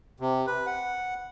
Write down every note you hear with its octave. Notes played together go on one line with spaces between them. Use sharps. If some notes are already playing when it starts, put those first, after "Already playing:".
C3
B4
F#5